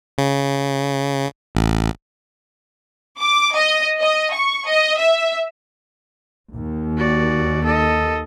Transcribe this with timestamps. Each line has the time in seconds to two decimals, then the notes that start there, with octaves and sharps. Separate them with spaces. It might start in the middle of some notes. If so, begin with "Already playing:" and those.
0.18 C#3
1.55 A1
3.20 D6
3.55 D#5
3.99 D#5
4.32 C#6
4.66 D#5
4.99 E5
6.54 D#2
6.97 F#4 D5
7.64 A4 D#5